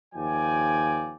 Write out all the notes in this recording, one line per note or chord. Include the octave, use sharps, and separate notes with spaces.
D#2 F3 D5 G5 G#5